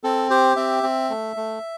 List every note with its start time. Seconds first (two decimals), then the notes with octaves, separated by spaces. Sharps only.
0.04 C4 A4
0.30 G4 C5
0.56 C4 E5
0.83 C4
1.10 A3
1.36 A3